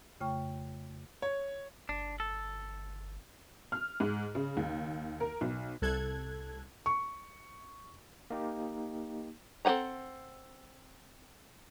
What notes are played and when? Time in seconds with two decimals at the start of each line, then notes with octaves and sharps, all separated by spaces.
0.21 F2 C#3 A3 G5 C#6 F6
1.22 C#5
1.89 G1 D4
2.20 A4
3.72 F6
4.00 G#2
4.35 C#3
4.57 D#2
5.20 A#4
5.41 B1
5.82 C2 A4 F#6 G#6
6.86 C#6
8.30 A#3 D#4 G4
9.65 C4 A4 B4 F#5 A#5